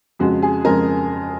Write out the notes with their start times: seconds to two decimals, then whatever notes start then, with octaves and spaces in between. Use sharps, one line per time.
0.19 F2 C#3 G#3 F#4
0.42 G#4
0.65 F2 C#3 G#3 A#4